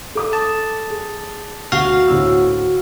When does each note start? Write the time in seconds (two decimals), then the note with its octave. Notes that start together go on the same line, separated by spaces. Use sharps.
0.15 A4 D6 D#6
0.33 A5
0.90 G#4
1.72 D2 F#4 F5
2.07 D2 A2 E6